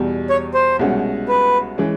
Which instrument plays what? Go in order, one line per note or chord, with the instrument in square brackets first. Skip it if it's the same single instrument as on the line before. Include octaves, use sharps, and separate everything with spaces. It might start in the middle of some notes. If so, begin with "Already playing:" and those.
Already playing: [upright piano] E2 B2 G3
[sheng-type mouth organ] C#5
C5
[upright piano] C2 B2 G#3 C#4 F#4
[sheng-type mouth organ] B4
[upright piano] E3 G#3 C#4